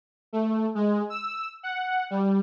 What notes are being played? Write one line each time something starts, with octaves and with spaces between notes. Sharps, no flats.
A3
G#3
E6
F#5
G3